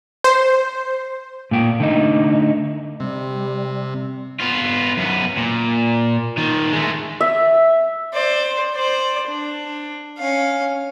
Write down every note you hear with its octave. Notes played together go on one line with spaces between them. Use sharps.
C5
A#2 A#3 G5
D3 A3 D#4
C3 G3
B3 F4
F#2 B3
A#2
D#3 F4
G#3 A3
E5
C5 D5
C5 D5
D4
C#4 F5